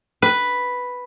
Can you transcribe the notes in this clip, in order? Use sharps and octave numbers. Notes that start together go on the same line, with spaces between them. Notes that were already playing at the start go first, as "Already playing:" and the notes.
B4